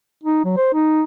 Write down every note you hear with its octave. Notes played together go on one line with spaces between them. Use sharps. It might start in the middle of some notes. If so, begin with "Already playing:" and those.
D#4
F#3
C5
D#4